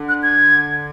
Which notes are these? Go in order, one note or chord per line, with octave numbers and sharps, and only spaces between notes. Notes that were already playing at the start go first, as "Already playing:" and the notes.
Already playing: D3
F#6
G#6